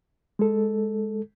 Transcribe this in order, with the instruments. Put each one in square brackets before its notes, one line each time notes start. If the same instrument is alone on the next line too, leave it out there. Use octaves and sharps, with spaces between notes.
[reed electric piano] G#3 A4